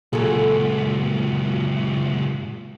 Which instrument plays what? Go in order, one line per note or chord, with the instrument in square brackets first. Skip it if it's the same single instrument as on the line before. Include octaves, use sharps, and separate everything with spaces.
[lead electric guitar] C#2 F#2 [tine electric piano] A#2 [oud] G#4 A4